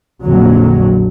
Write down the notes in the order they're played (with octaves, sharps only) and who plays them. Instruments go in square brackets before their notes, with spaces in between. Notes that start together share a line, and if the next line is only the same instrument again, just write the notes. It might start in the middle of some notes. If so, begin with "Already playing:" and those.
[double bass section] A#1 F2 A#2 D3 F#3